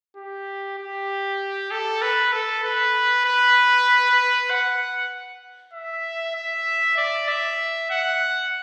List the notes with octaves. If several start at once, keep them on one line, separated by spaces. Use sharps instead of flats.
G4
G4
A4
B4
A4
B4
B4
F#5
E5
E5
D5
E5
F#5